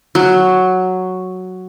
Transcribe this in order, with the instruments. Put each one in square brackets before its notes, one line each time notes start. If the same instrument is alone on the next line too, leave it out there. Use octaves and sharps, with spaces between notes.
[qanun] F#3